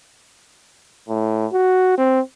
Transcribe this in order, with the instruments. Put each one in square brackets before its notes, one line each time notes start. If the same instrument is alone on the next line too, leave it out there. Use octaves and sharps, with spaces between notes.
[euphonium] A2
F#4
C4